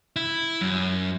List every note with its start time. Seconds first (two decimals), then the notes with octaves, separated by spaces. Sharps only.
0.16 E4
0.61 F#2